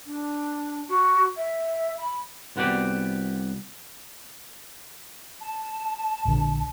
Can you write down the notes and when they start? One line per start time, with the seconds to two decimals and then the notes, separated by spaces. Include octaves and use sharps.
0.06 D4
0.88 F#4
1.37 E5
1.98 B5
2.56 C2 B3 F#4 G4 D5
5.41 A5
6.25 A#1 D3